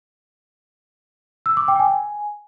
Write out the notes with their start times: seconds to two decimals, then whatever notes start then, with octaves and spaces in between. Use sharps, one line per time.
1.46 E6
1.57 D6
1.68 G5
1.79 G#5